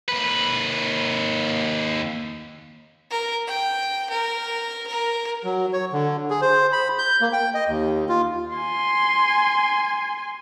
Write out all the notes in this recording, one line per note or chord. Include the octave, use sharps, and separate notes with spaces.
D#2 B4
A#4
G5
A#4
A#4
F#3
C#5
D3
G#4
C5
B5
G6
A#3
G5
D#5
D#2
F4
G#5 C6